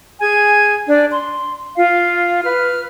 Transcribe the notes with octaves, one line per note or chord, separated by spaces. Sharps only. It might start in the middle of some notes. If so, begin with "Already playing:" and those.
G#4 G#5 G#6
D4 D5
C6
F4 F5
B4 F6